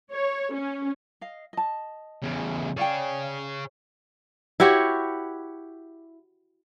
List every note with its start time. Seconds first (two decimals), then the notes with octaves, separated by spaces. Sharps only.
0.12 C#5
0.54 C#4
1.21 D#5 F5
1.53 D#5 A5
2.22 E2 C#3
2.77 G#4 C#5 D5 F5 G5
4.60 E4 F#4 G4 C#5